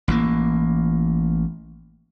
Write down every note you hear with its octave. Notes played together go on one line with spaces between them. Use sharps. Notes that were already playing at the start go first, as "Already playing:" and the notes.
A1 E3 A#3